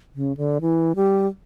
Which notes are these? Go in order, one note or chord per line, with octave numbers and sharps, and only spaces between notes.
C#3
D3
E3
G3